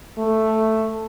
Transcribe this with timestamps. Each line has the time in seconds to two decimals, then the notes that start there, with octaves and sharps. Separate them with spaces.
0.18 A3